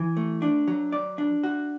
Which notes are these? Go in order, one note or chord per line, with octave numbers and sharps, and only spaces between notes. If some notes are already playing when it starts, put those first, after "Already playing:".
Already playing: E3
A3
D4
F#3
D5
D4
F#4